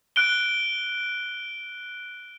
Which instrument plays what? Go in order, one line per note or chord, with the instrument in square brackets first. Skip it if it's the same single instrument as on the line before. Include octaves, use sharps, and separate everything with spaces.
[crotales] F#6 D7 G7